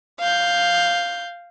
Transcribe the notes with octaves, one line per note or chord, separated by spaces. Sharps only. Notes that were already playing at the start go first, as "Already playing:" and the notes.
F5 G6